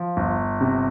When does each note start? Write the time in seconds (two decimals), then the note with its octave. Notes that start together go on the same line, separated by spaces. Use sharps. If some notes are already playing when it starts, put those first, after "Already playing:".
Already playing: F3
0.17 G1
0.61 C3